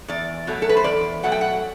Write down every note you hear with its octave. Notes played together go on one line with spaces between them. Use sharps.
E2 D5
B2 F#3 A3
A4
B4
C5
E2 D5
B2 F#3 A3 F#5
G5
F#5